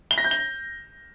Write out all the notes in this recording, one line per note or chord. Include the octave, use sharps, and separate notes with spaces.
G7
A#6
G6
G7